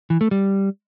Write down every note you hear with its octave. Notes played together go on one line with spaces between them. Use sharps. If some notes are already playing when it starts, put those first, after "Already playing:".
E3
A3
G3